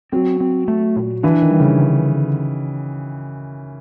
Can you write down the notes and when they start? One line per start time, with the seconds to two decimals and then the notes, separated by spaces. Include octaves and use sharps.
0.12 F#3 C4
0.40 C4
0.68 A3
0.96 A#2
1.23 E3 D4
1.42 D#3
1.50 G3
1.60 C#3
1.79 D3